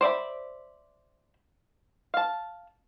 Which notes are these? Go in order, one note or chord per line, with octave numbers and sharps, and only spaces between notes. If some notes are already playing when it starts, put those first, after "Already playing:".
C5 D5 E5 B5
F5 A5